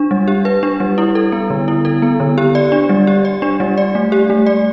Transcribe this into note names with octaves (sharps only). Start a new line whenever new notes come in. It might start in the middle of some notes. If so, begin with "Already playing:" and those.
Already playing: D4
G3
G4
B4
D4
G3
E4
A4
B3
D3
E4
A4
B3
D3
G4
D5
D4
G3
G4
D5
D4
G3
D5
A3
G4
A3
D5